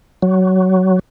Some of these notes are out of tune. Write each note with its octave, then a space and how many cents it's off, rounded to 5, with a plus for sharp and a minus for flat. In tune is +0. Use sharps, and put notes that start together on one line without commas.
F#3 +15